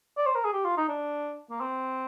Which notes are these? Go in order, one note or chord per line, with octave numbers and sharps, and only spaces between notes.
D5
C5
A#4
G#4
G4
F4
D#4
D4
A#3
C4